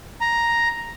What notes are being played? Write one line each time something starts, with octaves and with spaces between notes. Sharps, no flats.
A#5